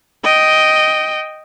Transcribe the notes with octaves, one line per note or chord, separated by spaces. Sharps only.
D#5 G5